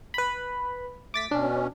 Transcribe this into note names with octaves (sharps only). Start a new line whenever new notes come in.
B4 B5
A3 D6 A6 B6
B2 C#4 D4